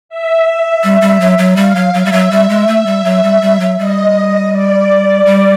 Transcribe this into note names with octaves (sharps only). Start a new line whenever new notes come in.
E5
G3
G3
F#3
F#3
G3 F5
F#3
F#3 E5
G3
F#3
G3
G#3
A3
G3
F#3
G3
G3
F#3
G3 D#5
D5
G3